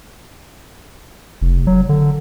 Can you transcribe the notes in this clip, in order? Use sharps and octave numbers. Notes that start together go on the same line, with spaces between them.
F1
F#3
D3